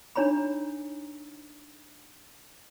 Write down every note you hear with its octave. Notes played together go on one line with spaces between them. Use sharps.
D4 D#4 C#5 A#5 B5